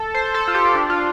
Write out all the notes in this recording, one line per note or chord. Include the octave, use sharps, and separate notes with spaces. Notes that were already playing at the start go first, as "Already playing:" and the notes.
Already playing: A4
C5
A4
F4
G4
D4
F4